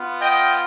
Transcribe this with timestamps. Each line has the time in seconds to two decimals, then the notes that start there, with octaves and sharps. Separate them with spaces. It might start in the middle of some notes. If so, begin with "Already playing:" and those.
Already playing: B3 F4
0.21 D#5 G5